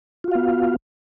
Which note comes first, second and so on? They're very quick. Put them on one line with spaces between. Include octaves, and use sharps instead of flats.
F4 F#4 F5 B3